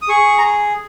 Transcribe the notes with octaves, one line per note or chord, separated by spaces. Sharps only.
D#6
G#4 C#6
A#5